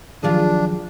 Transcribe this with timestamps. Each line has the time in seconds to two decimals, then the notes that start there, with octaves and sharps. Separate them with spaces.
0.23 D#3 F3 F#3 D4 F4 G4 G#4